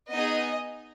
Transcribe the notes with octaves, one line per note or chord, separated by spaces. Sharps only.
B3 D#4 G#4 D#5